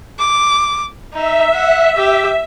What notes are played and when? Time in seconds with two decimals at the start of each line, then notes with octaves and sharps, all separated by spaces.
0.19 D6
1.13 D#4 E5
1.53 F#5
1.97 G4